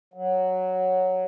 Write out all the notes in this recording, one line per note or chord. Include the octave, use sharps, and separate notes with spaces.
F#3